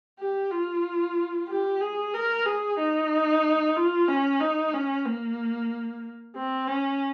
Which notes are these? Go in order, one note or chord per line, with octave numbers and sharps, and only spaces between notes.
G4
F4
G4
G#4
A#4
G#4
D#4
F4
C#4
D#4
C#4
A#3
C4
C#4